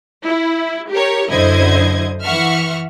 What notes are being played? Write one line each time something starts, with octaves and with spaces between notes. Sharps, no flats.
E4
G4 A#4 C#5
F#2 D3 E4 C5 D#5 G#6
E3 E5 F#5 C#6 F6